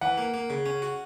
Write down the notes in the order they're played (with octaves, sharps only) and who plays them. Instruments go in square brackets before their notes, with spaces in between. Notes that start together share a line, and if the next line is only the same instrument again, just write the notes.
[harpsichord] E3 [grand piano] F#5
[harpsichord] A#3
A#3
C#3
C#4
F#4